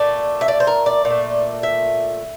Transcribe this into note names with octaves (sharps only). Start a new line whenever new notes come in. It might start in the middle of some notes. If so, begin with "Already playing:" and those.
Already playing: A#2 A3 D5
E5
D5
C5
A#4
D5
A#2
A3
E5